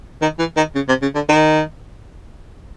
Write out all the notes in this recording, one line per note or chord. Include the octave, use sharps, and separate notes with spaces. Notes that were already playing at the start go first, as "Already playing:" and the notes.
D#3
E3
D#3
C#3
C3
C#3
D3
D#3